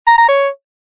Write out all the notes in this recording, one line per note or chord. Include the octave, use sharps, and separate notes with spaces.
A#5
A#5
C#5